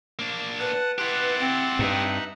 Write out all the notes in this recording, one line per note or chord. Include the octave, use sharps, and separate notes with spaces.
A#3 D4
B4 F#5 A5
E4 G4 F#5 A5 C6
C4
G2 D#4 E5 F#5